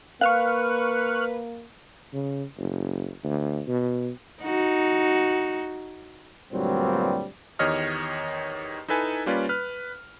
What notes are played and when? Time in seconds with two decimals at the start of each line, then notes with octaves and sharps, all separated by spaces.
0.21 A#3 B4 F5 C#6 F6 F#6
2.13 C#3
2.57 F#1
3.24 D2
3.67 B2
4.43 D#4 F#4
6.53 D2 G2 A#2 F#3 G3 C4
7.59 E2 D#3 G4 C#5 D#5 F6
8.88 D#4 E4 A4 B4 G#5
9.26 G3 A#3 C#4 F4 B4 D5
9.49 B4 F6